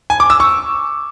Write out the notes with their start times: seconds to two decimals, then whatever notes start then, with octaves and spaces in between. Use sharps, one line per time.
0.10 G#5
0.20 D6
0.30 E6
0.40 C#6